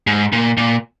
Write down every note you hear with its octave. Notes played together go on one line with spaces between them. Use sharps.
G#2
A#2
A#2